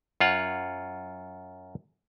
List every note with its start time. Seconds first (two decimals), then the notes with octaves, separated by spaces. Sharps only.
0.20 F#2 F4 C#5 F#5